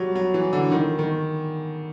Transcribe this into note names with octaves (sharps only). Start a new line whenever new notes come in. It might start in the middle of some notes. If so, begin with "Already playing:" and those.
Already playing: F#3 G3
F#3
E3
D3
D#3
D#3